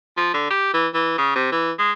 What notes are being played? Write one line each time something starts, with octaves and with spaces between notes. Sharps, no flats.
F3
D3
G4
E3
E3
C#3
C3
E3
G#3